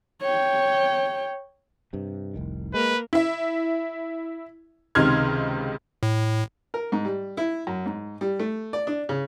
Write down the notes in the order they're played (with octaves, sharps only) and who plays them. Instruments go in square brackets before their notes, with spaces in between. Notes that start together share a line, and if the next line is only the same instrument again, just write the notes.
[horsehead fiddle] C#5 G5
[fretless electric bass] G2 C3
F1 C2 D#3
[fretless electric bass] G#3 [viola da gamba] A#3 A#4 [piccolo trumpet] B4
[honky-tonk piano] E4 E5
C#2 C3 D#3 C6 F6 G#6
[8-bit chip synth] A2
[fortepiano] A#4
G#2
G3
E4
F#2
G#2
G3
A3
D5
D4
C#3